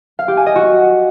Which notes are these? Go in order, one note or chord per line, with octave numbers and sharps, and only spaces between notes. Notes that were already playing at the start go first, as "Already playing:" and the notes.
F5
G4
G#5
D#5
F#4